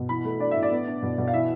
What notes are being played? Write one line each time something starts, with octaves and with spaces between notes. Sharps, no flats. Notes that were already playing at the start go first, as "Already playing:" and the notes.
Already playing: B2
E3 B5
A3
D4 D5
A2 E5
D5
B3
D4
B2
B2
F5
E3 E5